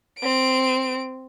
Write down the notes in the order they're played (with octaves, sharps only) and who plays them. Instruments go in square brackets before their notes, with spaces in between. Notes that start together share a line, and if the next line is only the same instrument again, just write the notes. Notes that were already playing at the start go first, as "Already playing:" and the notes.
[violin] C4 D7